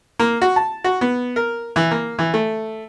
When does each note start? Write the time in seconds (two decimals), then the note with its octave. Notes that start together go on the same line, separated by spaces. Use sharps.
0.19 A#3
0.42 F#4
0.56 A5
0.84 F#4
1.01 B3
1.36 A#4
1.76 E3
1.91 A#3
2.19 E3
2.34 A3